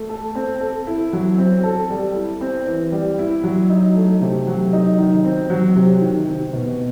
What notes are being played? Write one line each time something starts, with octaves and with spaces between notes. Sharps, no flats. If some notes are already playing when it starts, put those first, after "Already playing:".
Already playing: A3
A4
C4
A4
E4
F#3
C4
A4
G3
E4
C4
E3
G3
E4
F#3
D#4
A3
C3
F#3
D#4
D#3
C4
F#3
C3
D#3
C4
B2